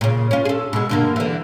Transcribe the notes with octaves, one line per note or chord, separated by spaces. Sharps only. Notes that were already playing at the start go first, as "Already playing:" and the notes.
A#2 C#3
C#4 F4
G#4 A4
B2 G#3
G2 D3 A#3
D3 E3